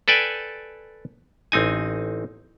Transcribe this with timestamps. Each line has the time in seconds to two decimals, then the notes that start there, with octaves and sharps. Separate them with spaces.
0.08 A4 B4 D5 G5 G#5
1.52 A1 C4 D#4 G#5